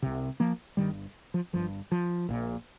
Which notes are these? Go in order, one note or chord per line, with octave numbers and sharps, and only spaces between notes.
C2 C3
F3 A#3
G1 G2 D#3 G3
F3
G1 G2 F3
F3
A#1 A#2